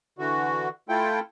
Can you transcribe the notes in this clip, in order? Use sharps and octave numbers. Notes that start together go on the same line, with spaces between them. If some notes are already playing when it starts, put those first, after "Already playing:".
D3 E3 F#4
A3 E4 F4 A4 G5